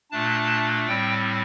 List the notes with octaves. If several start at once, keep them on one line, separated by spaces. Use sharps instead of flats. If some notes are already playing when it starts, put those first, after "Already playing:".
A#2 A3 D4 A5
A2 G3 C4 G5